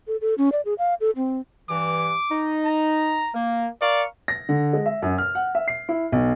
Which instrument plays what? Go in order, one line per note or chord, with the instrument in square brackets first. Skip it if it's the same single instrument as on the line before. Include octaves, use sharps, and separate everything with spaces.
[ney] A4
A4
C#4
D5
G#4
F5
A4
C4
[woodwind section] G2 E3 [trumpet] D6
[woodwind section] D#4
[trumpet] A#5
[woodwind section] A#3
[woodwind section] A#4 F5 C#6 [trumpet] D5
[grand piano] A#6
D3
G#3
E5
F#2
F6
F#5
E5
C7
E4
B1